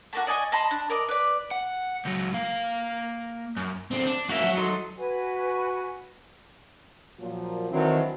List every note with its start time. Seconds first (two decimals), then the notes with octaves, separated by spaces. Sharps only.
0.13 A3 A#3 F#4
0.27 D5 D#5 G#5 C#6
0.52 D#5 A5 B5 C6
0.71 D4
0.90 A#4 D5 D#5
1.09 B4 D5
1.51 F#5
2.05 C#2 F#3
2.34 A#3 F5
3.57 F#2
3.91 D3 C4
4.06 D4
4.29 A#3 C#4 F#4 E5
4.41 F3 F#3
4.57 D#4 A4 C6
4.98 F#4 B4 G#5
7.20 A#2 F3 F#3
7.71 D#3 E3 F#3 C4 D4